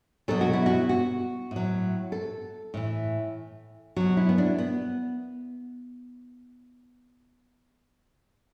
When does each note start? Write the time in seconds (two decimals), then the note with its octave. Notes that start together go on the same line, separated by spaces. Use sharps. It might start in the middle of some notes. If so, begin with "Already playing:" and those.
0.28 B2 F#3 A4
0.41 F#4
0.53 E4
0.66 F#4
0.89 F#4
1.51 A2 F#3
2.12 A4
2.74 A2 E3
3.96 B2 F#3 F#4
4.17 E4
4.29 B3
4.38 D4
4.58 B3